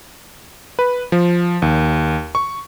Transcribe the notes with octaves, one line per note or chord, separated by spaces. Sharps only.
B4
F3
D#2
C#6